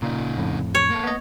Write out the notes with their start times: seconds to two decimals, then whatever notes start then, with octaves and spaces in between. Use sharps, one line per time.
0.02 A#2 C#3 D#4
0.37 F2 A2
0.75 C#5
0.90 A#3 A4
1.03 B3 D#5